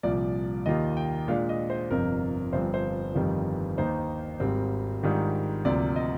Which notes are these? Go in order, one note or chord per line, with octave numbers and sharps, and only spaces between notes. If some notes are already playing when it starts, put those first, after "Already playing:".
C2 A#2 F3 D5
D#2 D#3 G3 A#3 F4 D#5
G5
A#2 G#3 D4 F5
D#5
C5
G1 F2 C3 A#4
G1 G2 F3 C4 C5
C5
G1 F2 D#3 G3
D#2 D#3 A#3 D#4 C5
G#1 G#2 G3 C4
G#2 D#3 G3 D4 F4
D2 C3 F3 A#3 D5
D#5